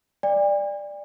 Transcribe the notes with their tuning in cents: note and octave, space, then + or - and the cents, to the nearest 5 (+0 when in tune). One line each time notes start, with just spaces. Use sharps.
D5 +10 G5 +45